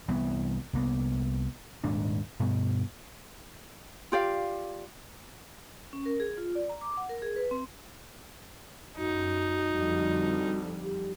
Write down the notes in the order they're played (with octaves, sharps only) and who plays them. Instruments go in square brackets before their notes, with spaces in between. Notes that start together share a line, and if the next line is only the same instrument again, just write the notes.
[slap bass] C2 E3 B3
C2 A#3 B3
D#1 G#2 D4
G2 B2
[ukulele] F4 G4 D5 F5
[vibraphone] C#4
A#4
G#4
F4
D5
A#5
D6
F#5
A#4
G#4
B4
C4
[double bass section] F#2 [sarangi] D#4 [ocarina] F#4
[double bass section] F2 D3 G3
[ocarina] G4